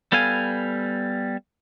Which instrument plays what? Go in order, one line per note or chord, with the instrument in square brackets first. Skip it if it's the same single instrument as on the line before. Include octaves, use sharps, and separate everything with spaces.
[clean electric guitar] G3 B3 A4 F5 G#5